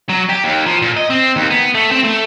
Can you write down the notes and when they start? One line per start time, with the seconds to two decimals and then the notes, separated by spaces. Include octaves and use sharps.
0.09 F#3
0.29 G4
0.44 D#2
0.66 F3
0.82 A#2
0.97 D#5
1.10 C4
1.36 D#2
1.51 B3
1.75 A3
1.91 C4
2.04 A3